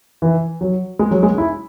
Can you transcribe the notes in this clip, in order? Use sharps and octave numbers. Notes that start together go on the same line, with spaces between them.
E3
F#3
G#3
F#3
G#3
E4